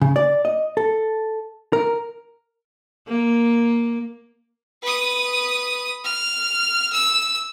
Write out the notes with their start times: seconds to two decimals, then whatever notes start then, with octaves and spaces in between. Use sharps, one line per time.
0.01 C#3
0.16 D5
0.45 D#5
0.77 A4
1.73 A#4
3.08 A#3
4.82 B4 D#6
6.04 F6
6.93 E6